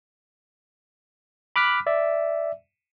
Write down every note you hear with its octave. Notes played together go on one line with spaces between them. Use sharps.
B5 D6 F6 F#6 B6
D5 E5